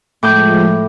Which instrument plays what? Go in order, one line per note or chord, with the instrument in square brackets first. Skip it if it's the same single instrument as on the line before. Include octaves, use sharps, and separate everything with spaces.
[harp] A2 D6 G6 [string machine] F3 G#3